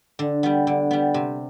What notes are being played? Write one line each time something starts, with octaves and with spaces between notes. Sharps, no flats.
D3
G3 B3
D3
G3 B3
C3